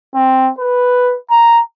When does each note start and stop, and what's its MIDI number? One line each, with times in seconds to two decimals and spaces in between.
0.15 0.50 60
0.59 1.16 71
1.31 1.62 82